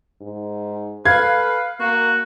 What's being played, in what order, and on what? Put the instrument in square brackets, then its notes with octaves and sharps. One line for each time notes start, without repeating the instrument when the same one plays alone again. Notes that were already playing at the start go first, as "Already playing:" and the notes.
[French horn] G#2
[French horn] A4 [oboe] B4 [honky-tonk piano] F5 [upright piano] G#6
[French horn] A#3 [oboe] F#4